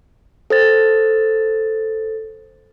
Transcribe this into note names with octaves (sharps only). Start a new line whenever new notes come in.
A4 C5 A6